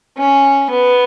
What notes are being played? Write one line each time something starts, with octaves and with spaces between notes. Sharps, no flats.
C#4
B3